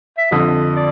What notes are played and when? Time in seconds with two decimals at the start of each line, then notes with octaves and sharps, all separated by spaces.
0.17 E5
0.31 F2 D3 F3 D#5
0.76 D5